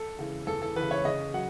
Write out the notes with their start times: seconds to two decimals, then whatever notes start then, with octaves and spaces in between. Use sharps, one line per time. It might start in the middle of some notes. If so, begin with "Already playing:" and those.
Already playing: A4
0.19 C#3 E3
0.47 E2 A4
0.62 A4
0.76 C#3 E3 B4
0.91 C#5
1.05 C#3 D#5
1.34 F#3 F#5